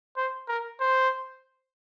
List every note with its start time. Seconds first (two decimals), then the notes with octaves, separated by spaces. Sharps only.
0.17 C5
0.48 A#4
0.81 C5